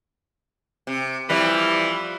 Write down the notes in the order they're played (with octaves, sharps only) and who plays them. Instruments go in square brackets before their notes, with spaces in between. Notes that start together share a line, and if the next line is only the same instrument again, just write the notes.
[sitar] C3
[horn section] E3 [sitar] F3 G3